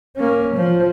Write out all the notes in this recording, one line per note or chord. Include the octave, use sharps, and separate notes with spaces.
A#3 C#4
F3